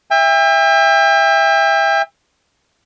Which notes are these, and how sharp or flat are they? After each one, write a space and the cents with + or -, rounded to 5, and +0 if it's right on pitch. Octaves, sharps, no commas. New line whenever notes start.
E5 +0 G5 +40